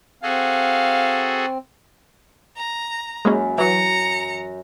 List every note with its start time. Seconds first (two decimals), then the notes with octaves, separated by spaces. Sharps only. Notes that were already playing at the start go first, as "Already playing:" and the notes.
0.23 C4 F#4 G#4 A4 F5
2.57 A#5
3.25 F#2 G#3 A#3 C#4 B5
3.58 E3 F#3 A#5 C#7